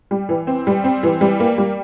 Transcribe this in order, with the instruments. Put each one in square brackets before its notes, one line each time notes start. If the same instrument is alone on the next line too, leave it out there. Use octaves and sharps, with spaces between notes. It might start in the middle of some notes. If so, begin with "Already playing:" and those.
[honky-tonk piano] G3
E3
C4
G3
C4
E3
G3
A#3
G3